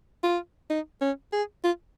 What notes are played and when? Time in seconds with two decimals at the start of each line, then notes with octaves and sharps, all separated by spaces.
0.24 F4
0.70 D#4
1.01 C#4
1.33 G#4
1.64 F4